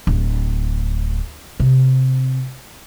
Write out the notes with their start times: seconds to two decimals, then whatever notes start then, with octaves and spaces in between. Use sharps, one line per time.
0.07 D1
1.60 C3